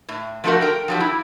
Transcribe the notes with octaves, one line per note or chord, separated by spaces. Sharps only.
A2
F3 A3 C4 D4 F#4 A#4
A#4 G5
F3 F#3 G4
E4